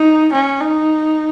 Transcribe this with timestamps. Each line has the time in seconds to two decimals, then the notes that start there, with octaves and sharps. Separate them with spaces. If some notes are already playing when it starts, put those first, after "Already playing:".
Already playing: D#4
0.32 C#4
0.61 D#4